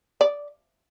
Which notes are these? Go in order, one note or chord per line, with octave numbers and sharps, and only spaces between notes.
D5